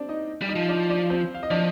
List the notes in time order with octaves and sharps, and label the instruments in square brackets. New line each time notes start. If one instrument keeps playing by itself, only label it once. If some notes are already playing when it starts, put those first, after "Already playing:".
Already playing: [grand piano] C4 D4 D5
D#4 D#5
[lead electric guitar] G3
[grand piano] D#4 D#5
[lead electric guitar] F3
[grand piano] D4 D5
D4 D5
C4 C5
F5
D#5
[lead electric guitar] F3 [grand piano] D4 D5